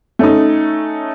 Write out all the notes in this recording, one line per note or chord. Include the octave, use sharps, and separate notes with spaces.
A3 C#4 D#4